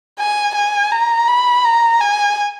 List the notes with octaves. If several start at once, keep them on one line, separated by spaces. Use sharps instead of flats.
G#5
G#5
A#5
B5
A#5
G#5